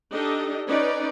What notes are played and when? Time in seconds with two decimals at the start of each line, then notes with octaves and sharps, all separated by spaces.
0.12 D4 D#4 G4 A4 D#5
0.66 C#4 D#4 B4 D5